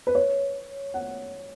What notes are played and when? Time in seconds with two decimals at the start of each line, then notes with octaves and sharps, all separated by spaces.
0.07 B4
0.15 C#5
0.94 F#5